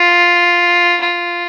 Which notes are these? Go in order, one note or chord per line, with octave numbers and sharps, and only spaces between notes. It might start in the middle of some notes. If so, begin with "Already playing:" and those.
Already playing: F4
F4